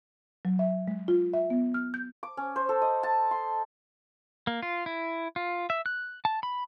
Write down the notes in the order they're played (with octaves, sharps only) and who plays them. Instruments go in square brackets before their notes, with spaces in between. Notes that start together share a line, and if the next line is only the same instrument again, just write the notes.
[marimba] F#3
E5
G#3
F4
E5
B3
F6
G6
[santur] D6
C#4
C5
A4
D#5
A5
C6
[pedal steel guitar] A#3
F4
E4
F4
E5
F#6
A5
B5